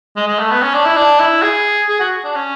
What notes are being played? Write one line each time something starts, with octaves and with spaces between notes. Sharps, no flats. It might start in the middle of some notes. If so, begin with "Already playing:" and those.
G#3
G#3
A3
B3
C#4
D4
E4
D4
E4
G#4
G#4
F#4
D4
C#4